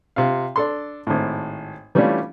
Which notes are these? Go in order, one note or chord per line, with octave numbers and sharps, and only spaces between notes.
C3 F4 F5
D4 A4 C6
G#1 A2
E3 G3 A3 C#4 D4 F4